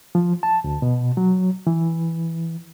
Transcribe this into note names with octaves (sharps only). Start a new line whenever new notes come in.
F3
A5
D2
B2
F#3
E3